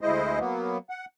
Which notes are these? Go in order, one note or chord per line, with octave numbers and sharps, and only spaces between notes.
D2 G#3 E4 C5 D#5
F#3 A#3 B3
F#5